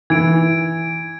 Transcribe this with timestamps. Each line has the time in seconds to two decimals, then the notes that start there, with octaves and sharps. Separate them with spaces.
0.10 E3 G#6 D7